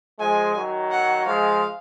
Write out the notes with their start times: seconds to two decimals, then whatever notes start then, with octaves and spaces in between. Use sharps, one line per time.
0.20 F3 G#3 G#5
0.56 D#3 F#3
0.91 F#5
1.26 F3 G#3 F5